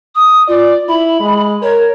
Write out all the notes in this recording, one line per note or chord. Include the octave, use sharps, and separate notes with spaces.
D#6
F4 D5
E4 B5
G#3
A#4 C#5